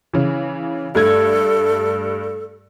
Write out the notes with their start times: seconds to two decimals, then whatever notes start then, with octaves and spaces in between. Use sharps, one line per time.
0.13 C#3 E3
0.95 G2 A3 A4 G#6